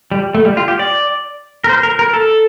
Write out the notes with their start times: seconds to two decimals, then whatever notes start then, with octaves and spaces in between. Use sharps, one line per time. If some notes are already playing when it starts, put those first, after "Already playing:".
0.12 G3
0.35 A3
0.45 G3
0.57 F4
0.68 G4
0.79 D5
1.64 A#4
1.69 C5
1.83 A#4
1.99 A#4
2.14 A4